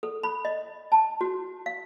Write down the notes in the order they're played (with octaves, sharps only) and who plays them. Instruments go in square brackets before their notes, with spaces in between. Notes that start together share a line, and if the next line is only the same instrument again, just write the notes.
[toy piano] A4
B5
D#5
A5
F#4
F5